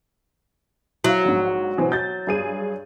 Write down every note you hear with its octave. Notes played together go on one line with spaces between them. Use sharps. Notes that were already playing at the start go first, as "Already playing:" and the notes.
F#3 E4 F5
A#1 G#2
B2 E3 C4
G6 A6
G2 G#4 D#7